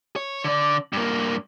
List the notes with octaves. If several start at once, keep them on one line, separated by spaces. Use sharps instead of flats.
C#5
D3 D5
G2 A#3